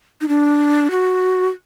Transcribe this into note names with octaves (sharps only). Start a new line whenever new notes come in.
D#4
D4
F#4